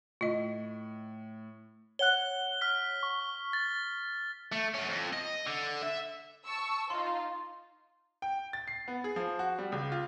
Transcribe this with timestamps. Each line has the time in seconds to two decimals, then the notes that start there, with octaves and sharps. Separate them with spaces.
0.21 A2 F4 D#5
1.99 C#5 F#5 F#6 G7
2.61 F6 B6
3.03 C#6
3.53 A6
4.52 A3
4.74 F#2 C#4
4.89 F2
5.13 D#5
5.47 D3
5.83 E5
6.45 A5 C#6 E6
6.90 D#4 F4 C6
8.22 G5
8.53 A6
8.68 C7
8.88 B3
9.04 G#4
9.16 F3
9.39 F#4
9.59 G3
9.72 C#2
9.92 F4